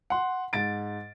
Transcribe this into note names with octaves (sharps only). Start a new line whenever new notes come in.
F#5 C6
G#2 A6 D7